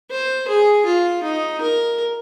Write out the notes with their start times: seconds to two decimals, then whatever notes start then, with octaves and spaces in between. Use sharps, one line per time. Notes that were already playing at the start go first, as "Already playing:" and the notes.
0.10 C5
0.48 G#4
0.85 F4
1.23 D#4
1.61 A#4